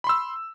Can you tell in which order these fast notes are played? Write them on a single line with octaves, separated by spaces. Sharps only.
B5 C6 E6